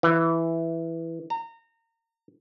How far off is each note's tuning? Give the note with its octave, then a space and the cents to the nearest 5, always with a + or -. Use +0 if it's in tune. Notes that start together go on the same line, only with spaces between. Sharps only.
E3 +5
A#5 -25